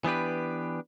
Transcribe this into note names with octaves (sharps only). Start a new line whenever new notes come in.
E3 B3 D4 G4 B4